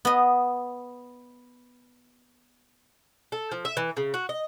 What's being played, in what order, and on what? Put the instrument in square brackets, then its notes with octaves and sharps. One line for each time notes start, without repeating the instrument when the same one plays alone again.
[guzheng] B3 D#5
[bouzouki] A4
F3
E5
E3
C#3
F#4
D#5